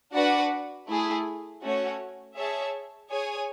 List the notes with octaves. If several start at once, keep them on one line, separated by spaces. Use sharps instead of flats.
D4 F#4 B4 D5 F#5
A3 E4 G#4
A3 C#4 F#4 C#5
G#4 C#5 E5 A5
G#4 C#5 G#5